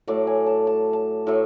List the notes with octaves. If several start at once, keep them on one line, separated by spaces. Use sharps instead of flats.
A2 F#3 A3 D5
G#5
A5
A5
A5
A2 F#3 A3